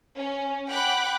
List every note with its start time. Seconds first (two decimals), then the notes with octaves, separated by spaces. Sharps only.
0.16 C#4
0.68 F#5 G5 B5 D6 F#6